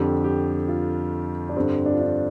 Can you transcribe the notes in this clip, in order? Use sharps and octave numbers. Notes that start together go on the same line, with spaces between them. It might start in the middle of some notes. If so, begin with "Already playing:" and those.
Already playing: F2 D3 G4
G4
F4
D4
G2 D3 C4
D4
F4
D4